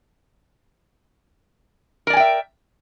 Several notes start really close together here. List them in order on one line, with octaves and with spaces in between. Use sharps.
A#4 D5 G#5 G5 E5